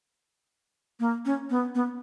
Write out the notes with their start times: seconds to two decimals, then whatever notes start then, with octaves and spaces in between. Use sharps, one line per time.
1.00 A#3
1.25 C#4
1.50 B3
1.75 B3